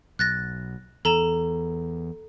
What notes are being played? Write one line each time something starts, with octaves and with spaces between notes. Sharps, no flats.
B1 F#6 A6 A#6
E2 A4 A#5 E7